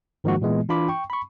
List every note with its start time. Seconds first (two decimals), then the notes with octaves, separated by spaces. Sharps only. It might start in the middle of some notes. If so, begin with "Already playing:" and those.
0.24 G#2 D#3 F3 G#3 A#3 F#4
0.42 A#2 E3 G#3 B3
0.69 E3 D4 F4 B5 D6
0.89 G5 C#6
1.10 B5 C#6